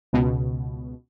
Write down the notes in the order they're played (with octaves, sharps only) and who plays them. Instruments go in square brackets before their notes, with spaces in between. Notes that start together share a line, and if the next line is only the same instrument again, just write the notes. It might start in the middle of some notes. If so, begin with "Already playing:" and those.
[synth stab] C#2 B2